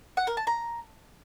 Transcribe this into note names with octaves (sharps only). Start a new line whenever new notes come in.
F#5
A#4
A5
A#5